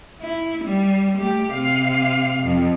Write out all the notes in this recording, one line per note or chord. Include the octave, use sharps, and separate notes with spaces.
E4
G3
A3 G4
C3 F5
F2